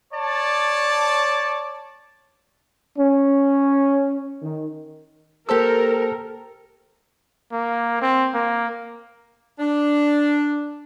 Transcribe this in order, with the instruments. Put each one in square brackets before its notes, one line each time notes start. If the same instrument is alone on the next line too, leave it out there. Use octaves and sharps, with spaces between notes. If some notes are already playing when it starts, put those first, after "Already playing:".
[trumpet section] C#5 D5 A5
[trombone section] C#4
D#3
[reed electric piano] A#3 C5 E6 [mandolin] G4 A4 [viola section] A#4
[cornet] A#3
C4
A#3
[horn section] D4